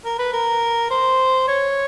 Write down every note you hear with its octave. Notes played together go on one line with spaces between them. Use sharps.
A#4
B4
A#4
C5
C#5